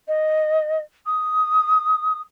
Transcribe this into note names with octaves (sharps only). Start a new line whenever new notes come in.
D#5
D#6